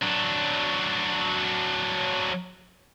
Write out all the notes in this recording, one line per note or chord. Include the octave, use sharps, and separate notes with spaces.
F#3 D4